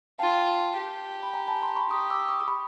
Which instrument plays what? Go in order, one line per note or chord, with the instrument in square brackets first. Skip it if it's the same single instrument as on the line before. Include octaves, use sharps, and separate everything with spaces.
[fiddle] F4 [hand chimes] G5 A5
[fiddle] G4
[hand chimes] B5
G#5 A#5
A5 B5
A#5 C6
B5 C#6
[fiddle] G4 [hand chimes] C#6 D#6
[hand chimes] D6 E6
C#6 D#6
B5 C#6